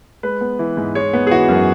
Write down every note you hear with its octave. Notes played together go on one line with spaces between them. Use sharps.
G#3 B4
B3
E3
G#2
G#3 C#5
B3
G#4
E3 F#4
F#2